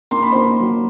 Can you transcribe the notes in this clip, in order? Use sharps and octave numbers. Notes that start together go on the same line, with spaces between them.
A#3 C6
B5
A#3 C5 C6
F#3